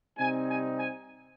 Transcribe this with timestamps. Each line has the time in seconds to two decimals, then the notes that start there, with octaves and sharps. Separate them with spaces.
0.18 C3 G3 C4 D#4 G#5
0.48 G#5
0.79 G#5